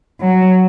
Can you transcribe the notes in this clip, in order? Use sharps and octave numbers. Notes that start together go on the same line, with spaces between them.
F#3